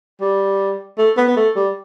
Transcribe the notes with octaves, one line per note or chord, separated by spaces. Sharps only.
G3
A3
B3
B3
A3
G3